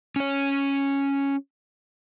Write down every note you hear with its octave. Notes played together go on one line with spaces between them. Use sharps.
C#4 C#5